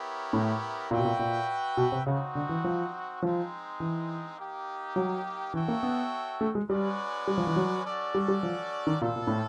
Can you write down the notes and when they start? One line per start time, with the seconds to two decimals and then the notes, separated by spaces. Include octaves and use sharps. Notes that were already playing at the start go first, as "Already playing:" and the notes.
Already playing: B3 E4 G4 A#4 C#5
0.33 A2
0.90 A#2 F#4 B4 E5 G5
0.98 B2
1.05 A#2
1.19 A#2
1.77 B2
1.92 C3
2.06 C#3 C4 D#4 F#4
2.35 D3
2.49 E3
2.64 F3
3.22 F3 G#3 C4 D#4
3.80 E3
4.38 A#3 D#4 G4
4.96 F#3
5.54 E3 F#4 A4 C#5 E5 G5
5.68 A#3
5.83 B3
6.41 A3
6.55 G#3
6.70 G3 G#3 C#4 F#4 B4 D5
7.27 G3
7.38 F3
7.47 E3
7.56 F#3
7.85 C#4 F#4 A4 D5
8.15 G3
8.28 G3
8.43 F3
8.87 D#3
9.01 A#2 G3 C4 F4 A4
9.16 A#2
9.27 A2